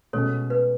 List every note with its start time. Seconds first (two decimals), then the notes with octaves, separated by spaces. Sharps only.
0.13 B2 G#3 C#4 A4 C#5
0.50 B4